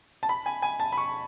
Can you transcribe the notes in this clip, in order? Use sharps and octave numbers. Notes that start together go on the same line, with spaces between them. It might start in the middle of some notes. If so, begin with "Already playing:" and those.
A5
B5
G#5
G#5
A5
B5
C#6